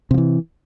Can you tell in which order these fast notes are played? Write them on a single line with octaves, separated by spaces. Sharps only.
C3 F3 E3